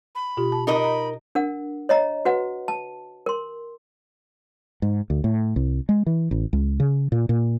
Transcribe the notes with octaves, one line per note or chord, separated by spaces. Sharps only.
B5
B2 F4 G4
A5
D#4 A#4 D#5 B5
A#5
D4 A#4 F#5
C#5 D#5 A#5
F#4 B4 F#5
A5
A#4 C6
G#2
D2
A2
C2
G#3
E3
A1
C#2
C#3
A#2
A#2